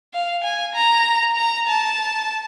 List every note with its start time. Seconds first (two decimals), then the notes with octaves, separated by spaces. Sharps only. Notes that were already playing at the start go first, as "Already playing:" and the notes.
0.14 F5
0.44 G#5
0.75 A#5
1.37 A#5
1.68 A5